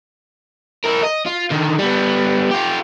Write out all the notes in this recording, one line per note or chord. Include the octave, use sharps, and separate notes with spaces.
E4 A#4
D#5
F4
D3 D#3
G3 B3
F4 G4